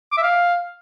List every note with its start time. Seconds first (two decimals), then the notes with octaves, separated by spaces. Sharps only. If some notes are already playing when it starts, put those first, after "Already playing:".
0.12 D6
0.18 E5
0.23 F5